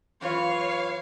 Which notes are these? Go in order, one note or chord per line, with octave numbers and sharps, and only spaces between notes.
F#2 E3 F4 C#5 F5